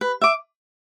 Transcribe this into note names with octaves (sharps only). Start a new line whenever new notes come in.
B4
E5 D6